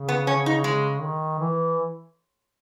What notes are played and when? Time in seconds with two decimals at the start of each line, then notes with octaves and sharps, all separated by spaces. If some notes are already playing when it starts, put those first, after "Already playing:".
Already playing: C#3
0.09 B3
0.27 C#4
0.46 D#4
0.64 C#3 G#3
1.02 D#3
1.39 E3